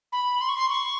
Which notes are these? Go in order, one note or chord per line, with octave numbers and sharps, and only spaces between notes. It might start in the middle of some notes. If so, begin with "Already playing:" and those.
B5
C6
C#6
C6
C#6